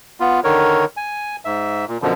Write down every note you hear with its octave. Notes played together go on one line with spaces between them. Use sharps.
B3 F4
D3 D#3 A#4 C#5
G#5
G#2 E5
A#2
F#2 B2 D3 F3